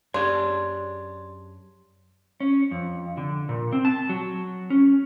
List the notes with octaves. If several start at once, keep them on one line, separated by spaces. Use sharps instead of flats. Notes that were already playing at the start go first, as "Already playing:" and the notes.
F#2 D4 G4 G#4 C#5 C6
C#4
F2
D3
A#2
C4
A5
F#3
C#4